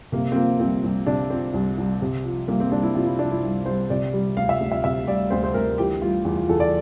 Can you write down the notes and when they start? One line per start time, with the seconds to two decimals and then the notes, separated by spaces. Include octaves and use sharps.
0.12 C3 A#3
0.32 C4
0.36 F3 A#3
0.60 C2 C4
0.84 C2
1.07 C3 D4
1.30 F3 C4
1.54 C2
1.78 C2
2.02 C3
2.24 F3
2.48 C2 A#3
2.60 C4
2.72 C2 D4
2.83 E4
2.95 C3 F4
3.07 E4
3.19 F3 D4
3.31 E4
3.43 C2
3.66 C2 C5
3.90 C3 D5
4.14 G3
4.37 D2 F5
4.49 E5
4.60 D2
4.72 E5
4.84 C3 E5
5.07 G3 D5
5.30 D2 C5
5.44 C5
5.54 D2 A#4
5.78 E3 G4
6.02 G3 F4
6.25 E2
6.37 F4
6.49 E2 A4
6.60 D5